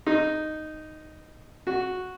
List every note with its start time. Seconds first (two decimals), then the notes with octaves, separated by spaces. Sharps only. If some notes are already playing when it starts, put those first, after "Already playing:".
0.07 D#4
1.67 F#4